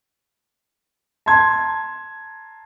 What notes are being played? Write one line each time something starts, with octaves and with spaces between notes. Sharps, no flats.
A5 A#5 C6 G#6